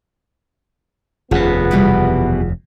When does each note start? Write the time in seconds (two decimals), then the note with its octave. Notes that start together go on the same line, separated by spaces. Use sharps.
1.31 F1 D#2 C3 B3 C#4 F4 G#4 F#5
1.71 B2 E3 G3